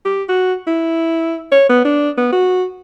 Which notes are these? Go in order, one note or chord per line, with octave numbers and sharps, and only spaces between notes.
G4
F#4
E4
C#5
B3
D4
B3
F#4